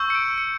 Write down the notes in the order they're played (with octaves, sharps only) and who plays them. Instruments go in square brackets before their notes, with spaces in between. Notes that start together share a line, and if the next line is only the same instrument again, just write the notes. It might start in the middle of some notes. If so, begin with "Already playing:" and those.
Already playing: [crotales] C#6 E6 G6
C#7
D7
C#7